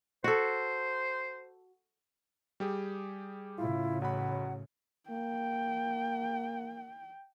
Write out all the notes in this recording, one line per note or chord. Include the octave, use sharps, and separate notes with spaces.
F#4 A4 C5
G3 G4 G#4
A2 C#3 E4 F4
A1 F#3 F#5 B5
A#3 G5